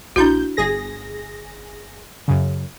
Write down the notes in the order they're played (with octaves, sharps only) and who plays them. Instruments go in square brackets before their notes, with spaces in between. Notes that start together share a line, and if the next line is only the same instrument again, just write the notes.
[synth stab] A#1 G6 [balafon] D4 E4 F#4
[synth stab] G1 G#4 A#6
F#2 C#3